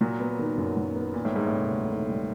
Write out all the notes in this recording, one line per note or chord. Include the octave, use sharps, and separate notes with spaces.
A#2 F#3
B3
D#3
F#2
F#3
B3
A#2 D#3
A2
G#2 G3
A2
C3
D2
D#3
G3